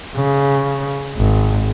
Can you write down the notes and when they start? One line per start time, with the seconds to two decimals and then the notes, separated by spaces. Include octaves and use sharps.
0.16 C#3
1.17 G#1